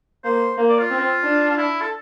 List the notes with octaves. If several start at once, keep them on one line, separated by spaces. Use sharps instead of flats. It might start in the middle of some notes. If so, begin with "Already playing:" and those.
A#3 C5
A#3
D5
F4
C4
D4
F4
E4
A4